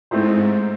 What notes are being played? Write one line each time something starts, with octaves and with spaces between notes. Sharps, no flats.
G#2 A3 C4 E4 C5